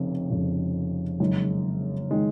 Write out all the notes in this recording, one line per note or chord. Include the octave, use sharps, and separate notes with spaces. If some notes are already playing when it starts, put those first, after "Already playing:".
Already playing: F1 F2 C#3
F1 F2 C#3
F#1 F#2 D#3 G#3
D#3 G#3